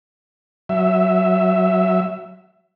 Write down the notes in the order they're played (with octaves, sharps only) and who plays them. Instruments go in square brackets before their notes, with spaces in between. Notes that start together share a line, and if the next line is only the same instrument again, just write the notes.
[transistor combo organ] F#3 E5